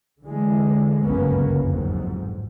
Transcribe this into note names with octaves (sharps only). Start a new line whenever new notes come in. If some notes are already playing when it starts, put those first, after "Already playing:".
D3 E3 G#3
G1 C#2 F#2 A#3 B3 C#4
A1 F2 G#2 F#3